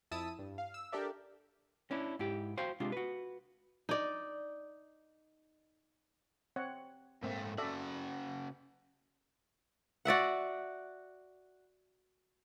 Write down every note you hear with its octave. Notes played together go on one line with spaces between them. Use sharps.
F2 E4 A5 D#6 E6 D#7
G2
F5
E6
D4 G4 A4 A#4 D5 E5
C#4 D4 E4
G#2 E4 G4
F#4 C5 F5 G5
C3 G#3 D4 F4
F#4 B4
D#4 D5
C4 C#5 F#5
G#2 A3 A#3 C4
C#3 F#4 A4 D5 E5
F#4 D5 E5 F#5